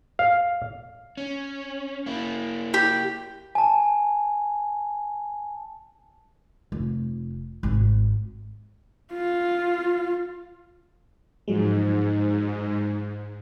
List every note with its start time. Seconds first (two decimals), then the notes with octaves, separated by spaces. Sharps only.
0.19 F5
1.17 C#4
2.06 A#3 E4
2.74 G4
3.55 G#5 A5
6.72 F1
7.63 G#1
9.14 F4
11.48 G#2 F3 F#3 G#3